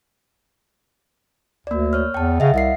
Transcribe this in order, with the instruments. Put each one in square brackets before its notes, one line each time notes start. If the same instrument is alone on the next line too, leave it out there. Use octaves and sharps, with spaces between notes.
[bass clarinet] D2 [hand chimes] A#3 D5
[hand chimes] C#5 F6
[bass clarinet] E2 [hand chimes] G5 A5
[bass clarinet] C#3 [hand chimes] D#5 E5 F#5
[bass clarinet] C2 [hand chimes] E5 F5 C7